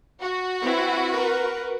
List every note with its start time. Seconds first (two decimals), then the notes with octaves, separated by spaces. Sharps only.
0.21 F#4
0.62 C4 E4 B4
1.12 A#4 B4